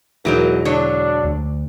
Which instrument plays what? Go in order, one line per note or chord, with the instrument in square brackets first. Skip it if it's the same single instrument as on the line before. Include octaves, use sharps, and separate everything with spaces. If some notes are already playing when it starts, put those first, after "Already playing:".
[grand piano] E1 G#3 D7 [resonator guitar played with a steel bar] E3 F#3 D#4 [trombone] A#4
[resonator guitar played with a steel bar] D3 F#3 C#5 [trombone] D4
[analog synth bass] D2